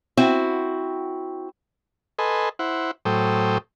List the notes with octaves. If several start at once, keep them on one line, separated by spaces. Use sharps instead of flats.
C4 E4 F#4
A4 B4 D#5 G#5 C6
E4 C5 F#5
A2 F#3 A4 C5 G5 D#6